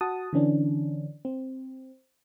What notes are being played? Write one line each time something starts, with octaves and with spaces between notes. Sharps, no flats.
F#4 F#5 A5 D#6
D3 E3 C#4 D4
C4